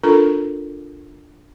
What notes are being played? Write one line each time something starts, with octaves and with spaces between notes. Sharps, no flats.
D4 F4 A4 A#4 A#5